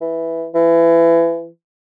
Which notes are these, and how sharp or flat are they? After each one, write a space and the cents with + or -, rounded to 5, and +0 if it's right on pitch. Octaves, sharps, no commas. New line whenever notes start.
E3 +0
E3 +25